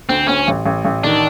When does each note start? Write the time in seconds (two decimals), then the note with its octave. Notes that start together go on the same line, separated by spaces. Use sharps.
0.09 D2 C4
0.28 D2 C#4
0.48 A1
0.65 A1
0.85 A1
1.04 D#3 D4